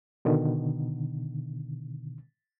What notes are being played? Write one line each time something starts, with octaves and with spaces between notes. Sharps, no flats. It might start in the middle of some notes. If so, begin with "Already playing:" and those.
B2 D3 D#3